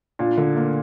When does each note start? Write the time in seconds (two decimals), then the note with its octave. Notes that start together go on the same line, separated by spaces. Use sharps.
0.19 A#2 D4
0.38 D3
0.56 A#3